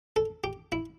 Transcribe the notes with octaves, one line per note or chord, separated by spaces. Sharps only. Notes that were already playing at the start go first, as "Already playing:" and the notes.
A4
G4
E4